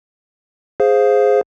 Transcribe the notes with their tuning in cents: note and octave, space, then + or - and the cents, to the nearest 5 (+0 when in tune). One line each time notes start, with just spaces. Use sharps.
G#4 +0 C5 +0 F5 +0